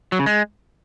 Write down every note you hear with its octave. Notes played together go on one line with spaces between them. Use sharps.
F#3
C#3
G#3